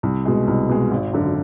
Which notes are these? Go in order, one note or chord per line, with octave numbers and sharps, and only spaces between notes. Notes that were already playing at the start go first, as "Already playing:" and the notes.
C2
B2 G#3
C2
B2 G#3
G#1
F#2 D3